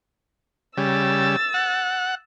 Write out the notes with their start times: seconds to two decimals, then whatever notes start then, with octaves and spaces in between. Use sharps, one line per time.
0.77 C#3 G3 E6 A6
1.54 F#5